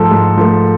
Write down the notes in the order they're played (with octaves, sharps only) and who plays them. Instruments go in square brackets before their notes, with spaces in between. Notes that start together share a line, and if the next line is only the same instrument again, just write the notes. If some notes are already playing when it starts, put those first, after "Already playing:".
Already playing: [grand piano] G#2 F3 A3 [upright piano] A4
[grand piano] G#2
F3 A3